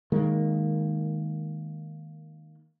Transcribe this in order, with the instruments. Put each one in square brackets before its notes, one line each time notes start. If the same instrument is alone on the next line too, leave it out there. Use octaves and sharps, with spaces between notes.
[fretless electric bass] D#3 G#3 A#3